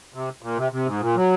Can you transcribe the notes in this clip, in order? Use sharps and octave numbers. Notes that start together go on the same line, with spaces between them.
C3
A#2
C3
C3
G#2
A#2
F#3